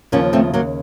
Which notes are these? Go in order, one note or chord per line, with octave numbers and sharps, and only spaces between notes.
D#2 C#3 F3 A#3 C#4
A3 C4
F#3 A#3